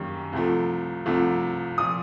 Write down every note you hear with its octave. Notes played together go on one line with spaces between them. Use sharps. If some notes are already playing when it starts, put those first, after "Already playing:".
Already playing: F#2 D#3 G3 A#3
C2 C3 F3 A3
C2 C3 F3 A3
A#2 F3 D#6